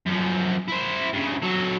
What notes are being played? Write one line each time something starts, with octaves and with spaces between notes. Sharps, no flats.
F#2 F3
E4 C5
G2 C#3
F#3 A4